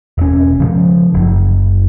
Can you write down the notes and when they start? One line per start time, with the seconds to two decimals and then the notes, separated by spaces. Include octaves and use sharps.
0.18 E1 C#4
0.60 C#3 F3
1.14 F#1